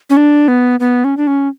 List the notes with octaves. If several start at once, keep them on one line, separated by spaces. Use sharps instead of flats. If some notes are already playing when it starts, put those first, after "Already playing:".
C#4
D4
B3
B3
C#4
D4
C#4